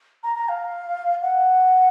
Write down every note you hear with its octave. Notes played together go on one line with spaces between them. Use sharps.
A#5
A#5
F5
F#5